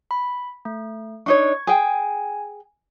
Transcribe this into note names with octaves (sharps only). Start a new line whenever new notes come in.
B5
A3
D4 D#4 C#5 C#6 G#6
G#4 G5 G#5